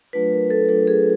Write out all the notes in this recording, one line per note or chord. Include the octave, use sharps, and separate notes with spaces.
F#3 A3 D4 F4 B4
A#4
A4
F#3 A3 D4 F4 A4
G#4